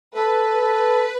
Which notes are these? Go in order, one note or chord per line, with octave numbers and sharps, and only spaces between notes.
A4 B4
A4